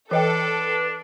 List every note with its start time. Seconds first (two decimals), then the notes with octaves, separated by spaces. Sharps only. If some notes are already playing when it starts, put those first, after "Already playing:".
0.11 E3 D4 A4 B4 D#5 G5